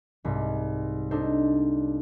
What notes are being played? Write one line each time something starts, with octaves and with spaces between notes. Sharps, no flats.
C2 G#2
D4 D#4 A4 C5